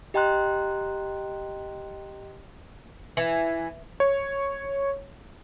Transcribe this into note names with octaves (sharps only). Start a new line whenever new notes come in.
G4 D#5 G5 A#5 C6 F#6
E3
C#5